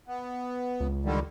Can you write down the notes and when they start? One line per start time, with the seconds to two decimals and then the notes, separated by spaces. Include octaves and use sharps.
0.08 B3
0.80 C#2
1.05 D3 D#3 G3